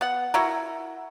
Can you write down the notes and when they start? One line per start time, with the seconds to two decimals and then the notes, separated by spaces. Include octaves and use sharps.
0.01 B3 F#5
0.34 E4 F#4 A#4